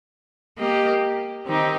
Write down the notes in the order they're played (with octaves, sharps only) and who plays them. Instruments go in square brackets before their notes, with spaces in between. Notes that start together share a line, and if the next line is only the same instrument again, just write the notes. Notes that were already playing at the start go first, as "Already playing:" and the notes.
[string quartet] A#3 G4 D#5
D#3 C4 D#4 G4